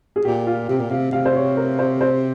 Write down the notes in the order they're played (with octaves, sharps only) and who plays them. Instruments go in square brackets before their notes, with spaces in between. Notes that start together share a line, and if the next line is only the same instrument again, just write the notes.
[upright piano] G#4
[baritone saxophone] A#2 [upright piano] G4
[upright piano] F4
[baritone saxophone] C3 [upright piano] G4
[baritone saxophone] A#2
[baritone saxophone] C3 [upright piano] F5
[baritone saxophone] C3 [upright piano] F5
[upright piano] C5
C#5
A#4
C5
C5